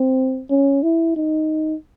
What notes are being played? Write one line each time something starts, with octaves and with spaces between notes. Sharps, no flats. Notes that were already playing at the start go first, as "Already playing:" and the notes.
Already playing: C4
C#4
E4
D#4